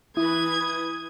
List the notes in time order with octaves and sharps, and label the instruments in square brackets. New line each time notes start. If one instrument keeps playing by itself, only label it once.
[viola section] E3 B4 [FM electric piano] E4 [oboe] D#6 [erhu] G#6